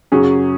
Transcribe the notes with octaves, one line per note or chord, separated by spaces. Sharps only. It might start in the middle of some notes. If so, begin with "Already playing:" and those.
F#2 C#3 F#3 C#4 G#4